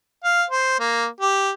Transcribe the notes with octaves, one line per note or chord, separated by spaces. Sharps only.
F5
C5
A#3
G4